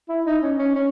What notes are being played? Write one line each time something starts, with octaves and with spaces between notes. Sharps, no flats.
E4
D#4
C#4
C#4
C#4